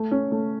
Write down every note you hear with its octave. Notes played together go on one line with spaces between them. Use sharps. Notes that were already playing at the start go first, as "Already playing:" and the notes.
Already playing: A3
C#4
A3